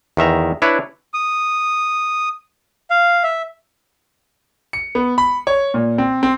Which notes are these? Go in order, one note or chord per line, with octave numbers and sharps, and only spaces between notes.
E2 D#3 E5 A#5
D4 E4 B4 C#5
D#6
F5
E5
C#7
B3
B5
C#5
A#2
C4
C4